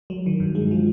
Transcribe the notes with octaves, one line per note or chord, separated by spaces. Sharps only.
F#3
D#3
G2
G#3
F3